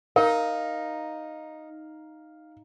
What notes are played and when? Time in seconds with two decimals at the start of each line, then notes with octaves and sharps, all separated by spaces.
0.16 D#4 A#4 F5